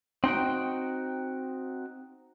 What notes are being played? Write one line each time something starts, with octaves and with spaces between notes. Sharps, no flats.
C4 D#4 F#4 G5